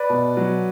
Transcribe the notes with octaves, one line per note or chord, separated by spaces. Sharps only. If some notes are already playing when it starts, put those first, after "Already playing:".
Already playing: B4 D5
B2
F#3